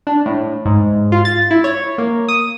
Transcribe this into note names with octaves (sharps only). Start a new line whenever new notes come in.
D4
A2
G#2
F4
A6
E4
C#5
A#3
D#6